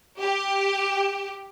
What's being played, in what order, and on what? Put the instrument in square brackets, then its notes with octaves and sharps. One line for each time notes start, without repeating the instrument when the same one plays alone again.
[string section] G4